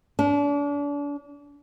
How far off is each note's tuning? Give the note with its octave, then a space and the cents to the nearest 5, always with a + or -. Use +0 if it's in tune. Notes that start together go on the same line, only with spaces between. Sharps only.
D4 -35